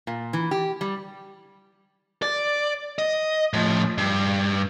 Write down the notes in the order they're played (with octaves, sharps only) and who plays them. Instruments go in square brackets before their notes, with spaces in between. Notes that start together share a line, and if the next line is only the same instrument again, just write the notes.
[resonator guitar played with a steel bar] A#2
E3
G4
G3
[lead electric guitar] D5
D#5
A2 F3
G2